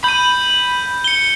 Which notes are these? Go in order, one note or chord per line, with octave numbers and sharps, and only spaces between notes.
B5 G6 D#7
C#7 G7